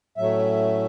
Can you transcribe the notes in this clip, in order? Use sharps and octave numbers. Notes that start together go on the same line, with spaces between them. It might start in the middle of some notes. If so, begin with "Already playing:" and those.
A2 F#3 A3 C#4 E5